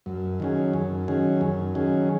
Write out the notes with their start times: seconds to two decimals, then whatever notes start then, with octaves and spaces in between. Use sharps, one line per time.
0.06 F#2
0.40 D#3 F#3 C#4 G#4
0.73 F#2
1.08 D#3 F#3 C#4 G#4
1.41 F#2
1.75 D#3 F#3 C#4 G#4